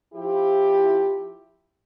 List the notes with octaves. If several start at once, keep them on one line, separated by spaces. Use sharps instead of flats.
F3 E4 G4